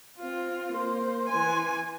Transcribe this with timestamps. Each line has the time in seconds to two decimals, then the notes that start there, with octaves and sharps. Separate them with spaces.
0.19 C4 F4 F5
0.73 A#3 C5 C6
1.29 E3 G#5